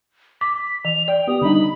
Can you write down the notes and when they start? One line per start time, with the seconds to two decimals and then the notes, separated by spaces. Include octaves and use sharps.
0.41 D6 B6
0.85 E3 F7
1.08 D5 G5
1.27 B3 G4 D#6
1.42 D3 G3 D#4 B5